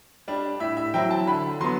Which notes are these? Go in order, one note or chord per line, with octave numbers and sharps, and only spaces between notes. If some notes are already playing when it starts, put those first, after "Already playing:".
G3 D4
A2 E5
E5
F#3 C4 E4 G5
A5
D3 B5
F#3 B3 C6